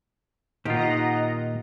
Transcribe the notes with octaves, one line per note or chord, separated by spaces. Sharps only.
A#2 D#3 D#4 F4 G4 D#5 F#5 A#5